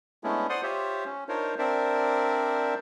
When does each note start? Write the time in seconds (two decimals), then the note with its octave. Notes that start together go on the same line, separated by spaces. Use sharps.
0.24 G#3 A3 B3 C#4 D4 E4
0.49 C5 D5 F#5 C6 D#6
0.63 F4 G4 C5 C#5 E5
1.05 C#4
1.29 D4 D#4 F4 A#4 C5 C#5
1.59 C4 D4 A#4 C5 D5 E5